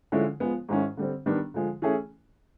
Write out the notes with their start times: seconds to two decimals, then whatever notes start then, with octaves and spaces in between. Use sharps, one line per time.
0.12 D3 F3 G#3 C#4 E4
0.40 F3 G#3 B3
0.69 G#2 D#3 G#3 C#4 E4
0.97 D3 G3 C4
1.26 D#3 G3 B3 D4 G4
1.54 D3 F3 G#3
1.82 E3 A3 C#4 E4 G#4